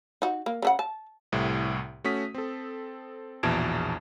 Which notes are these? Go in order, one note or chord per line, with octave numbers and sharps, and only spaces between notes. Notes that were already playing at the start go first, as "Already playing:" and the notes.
D#4 F#4
A#3
C#3 D4 F#5
A5
C2 A2 C3
A3 C#4 F#4 D#6 B6
C4 A4
A#1 E2 B2 A5 G#6 D7